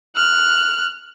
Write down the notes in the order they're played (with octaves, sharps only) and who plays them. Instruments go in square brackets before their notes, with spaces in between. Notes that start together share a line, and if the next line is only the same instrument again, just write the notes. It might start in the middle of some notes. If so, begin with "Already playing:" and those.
[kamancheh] F6 F#6